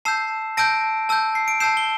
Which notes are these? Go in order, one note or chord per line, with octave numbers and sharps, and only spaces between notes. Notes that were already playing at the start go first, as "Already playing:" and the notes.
A5 E6 G6 C7 E7
A5 E6 G6 A#6 D7
A5 E6 G6
C7
D7
A5 E6 G6 C7 E7
G7